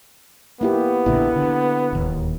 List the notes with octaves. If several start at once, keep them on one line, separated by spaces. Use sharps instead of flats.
A#3 B3 E4 G4
A#1 A#2 D3 E4
D3
D1 D#2